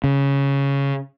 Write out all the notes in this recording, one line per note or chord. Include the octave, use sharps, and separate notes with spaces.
C#3